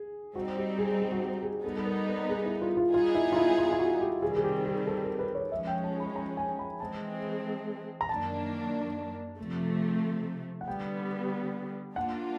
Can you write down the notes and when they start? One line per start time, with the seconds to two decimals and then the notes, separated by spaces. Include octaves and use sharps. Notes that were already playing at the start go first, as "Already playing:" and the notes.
Already playing: G#4
0.35 G3 C4 D#4 F#4
0.57 G4
0.78 G#4
1.00 G#4
1.12 F#4
1.21 G4
1.43 G#4
1.64 G3 B3 D#4 A4
1.76 A4
1.86 A#4
2.07 A4
2.29 G#4
2.45 E4
2.62 F4
2.77 F4
2.93 G3 B3 D#4 F4 G#4
3.15 E4
3.32 F4
3.36 E4
3.58 F4
3.72 F4
3.79 F#4
4.01 G4
4.22 C3 D#3 G3 C4 G#4
4.37 G#4
4.44 G4
4.65 G#4
4.87 A4
5.04 A#4
5.19 B4
5.35 C#5
5.51 F3 G#3 C#4 E5
5.67 G5
5.84 A5
6.00 B5
6.16 A#5
6.37 G#5
6.59 B5
6.80 E3 G#3 C4 A5
8.01 A#5
8.09 F#2 D#3 F#3 A#3 D4 A5
9.39 C3 F3 A3
10.61 F#5
10.67 D3 G3 B3 G5
11.96 G3 A#3 D4 F4 F#5